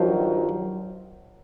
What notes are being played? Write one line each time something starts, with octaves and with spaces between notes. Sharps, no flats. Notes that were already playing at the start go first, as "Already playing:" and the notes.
Already playing: G2 D#3 F3 F#3